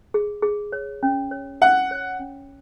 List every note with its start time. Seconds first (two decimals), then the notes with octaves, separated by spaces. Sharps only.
0.14 G#4
0.43 G#4
0.72 C#5
1.03 C#4
1.31 C#5
1.61 C#4 F#5
1.91 C#5
2.19 C#4